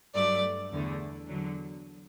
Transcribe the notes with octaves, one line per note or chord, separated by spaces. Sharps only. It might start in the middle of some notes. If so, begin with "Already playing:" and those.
G2 F#3 A3 D5
E2 D3 A3
E2 D3 F#3